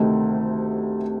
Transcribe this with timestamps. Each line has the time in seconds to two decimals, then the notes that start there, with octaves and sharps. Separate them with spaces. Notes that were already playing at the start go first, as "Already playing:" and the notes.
Already playing: D2 C3 D#3 A3 D#4